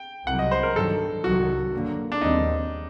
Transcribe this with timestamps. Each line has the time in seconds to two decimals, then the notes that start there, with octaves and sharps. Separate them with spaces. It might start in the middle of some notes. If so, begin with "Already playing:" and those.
Already playing: G5
0.26 C2 C3 F#3 F#5
0.39 D#5
0.51 C5
0.63 A#4
0.75 G2 D#3 F#3 A4
1.24 C2 C3 D#3 F#3 F#4
1.73 G2 D3 F#3 A#3
2.12 D4
2.21 D#2 D#3 G3 C4 D#4